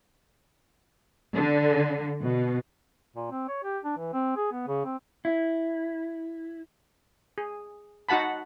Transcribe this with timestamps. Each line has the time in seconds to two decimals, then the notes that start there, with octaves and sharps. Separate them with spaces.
1.36 D3
2.22 B2
3.16 A#2
3.31 C4
3.49 C#5
3.64 G4
3.84 D4
3.97 E3
4.13 C4
4.37 G#4
4.52 B3
4.68 C#3
4.85 C4
5.25 E4
7.38 G#4
8.09 D#4 F#4 F#5 A5 B5